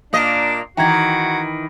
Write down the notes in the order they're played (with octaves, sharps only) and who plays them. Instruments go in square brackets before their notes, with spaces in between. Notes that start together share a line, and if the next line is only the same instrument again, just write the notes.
[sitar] A#2 A#3 D#5 [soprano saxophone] D4
[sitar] D#3 E3 [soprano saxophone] F#4 [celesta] G5 A#5 G#6